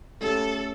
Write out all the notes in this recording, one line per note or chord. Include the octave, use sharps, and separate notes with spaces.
A3 C#4 G4 A4